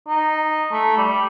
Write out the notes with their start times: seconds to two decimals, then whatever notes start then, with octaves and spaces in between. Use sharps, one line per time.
0.08 D#4
0.72 A3
0.97 G3